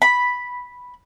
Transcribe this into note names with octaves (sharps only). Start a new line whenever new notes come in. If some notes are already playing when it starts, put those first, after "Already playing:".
B5